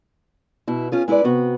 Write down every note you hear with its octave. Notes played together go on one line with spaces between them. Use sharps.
B2 E4
C#4 F4 G#4
G#3 E4 G4 B4 D5
C3 B3 F#4